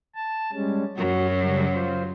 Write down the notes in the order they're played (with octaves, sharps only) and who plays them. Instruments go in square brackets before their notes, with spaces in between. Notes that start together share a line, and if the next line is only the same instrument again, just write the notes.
[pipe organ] A5
G3 G#3 C#4
[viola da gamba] F#2 F#3 [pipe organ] F#4
[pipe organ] C#3 G3
F4 C5